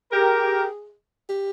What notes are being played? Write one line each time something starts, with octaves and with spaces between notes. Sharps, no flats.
G4 G#4 A#4
G4